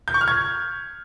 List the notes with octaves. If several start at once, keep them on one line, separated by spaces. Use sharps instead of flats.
G6
C#6
F6
G#6